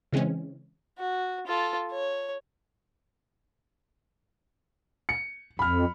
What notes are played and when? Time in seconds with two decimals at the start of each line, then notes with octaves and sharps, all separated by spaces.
0.12 C#3 E3 G#3 C4 C#4
0.99 F#4
1.47 F4 A4
1.92 C#5
5.09 C#7
5.59 F2 B5 F6